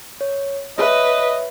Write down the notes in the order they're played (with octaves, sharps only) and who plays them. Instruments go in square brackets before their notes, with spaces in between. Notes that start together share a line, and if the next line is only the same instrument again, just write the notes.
[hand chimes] C#5
[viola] B4 [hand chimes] C#5 E5 [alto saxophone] D#5